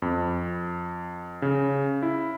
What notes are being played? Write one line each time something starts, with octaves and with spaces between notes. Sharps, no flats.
F2
C#3
E4